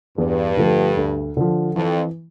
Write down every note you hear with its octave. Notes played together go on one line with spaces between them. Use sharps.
E2 G2
D3 F3 A3
D2
D3 F3
F2 E3